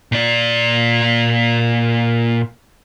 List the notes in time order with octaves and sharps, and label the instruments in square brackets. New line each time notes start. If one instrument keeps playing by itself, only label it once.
[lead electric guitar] A#2 D5